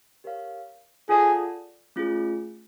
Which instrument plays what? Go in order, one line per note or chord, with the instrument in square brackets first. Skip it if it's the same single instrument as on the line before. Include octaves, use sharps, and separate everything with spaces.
[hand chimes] G4 A#4 C#5 F5
[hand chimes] F4 A4 D5 F#5 A5 [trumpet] G#4
[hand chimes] A3 C#4 F4 G#4